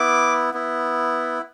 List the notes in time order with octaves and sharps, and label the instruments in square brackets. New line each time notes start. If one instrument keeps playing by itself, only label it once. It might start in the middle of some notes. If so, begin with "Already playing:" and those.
Already playing: [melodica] B3 E4 D6
B3 E4